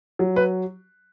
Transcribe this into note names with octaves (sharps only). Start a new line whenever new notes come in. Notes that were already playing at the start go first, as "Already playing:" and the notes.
F#3
B4